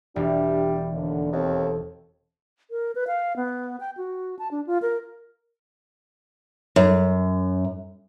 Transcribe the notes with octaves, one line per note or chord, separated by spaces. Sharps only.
E1 G3 D4 G4
D#2 D3
D#2 C4 A4
A#4
B4
F5
B3
G5
F#4
A5
D4
F4
A#4
F#2